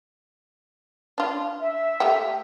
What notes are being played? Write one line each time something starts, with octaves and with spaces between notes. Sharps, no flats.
D4 F4
E5
A3 G4 G5